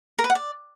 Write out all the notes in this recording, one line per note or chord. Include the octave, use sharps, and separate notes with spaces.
A#4
B4
F#5
D5